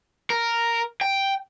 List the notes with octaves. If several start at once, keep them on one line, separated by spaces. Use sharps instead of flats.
A#4
G5